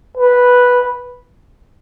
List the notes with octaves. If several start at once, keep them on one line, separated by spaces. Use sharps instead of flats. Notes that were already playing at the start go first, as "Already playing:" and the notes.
B4